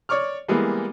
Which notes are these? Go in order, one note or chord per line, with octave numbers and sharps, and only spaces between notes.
C#5 D5 C#6 D6 F6
E3 G3 G#3 A#3 B3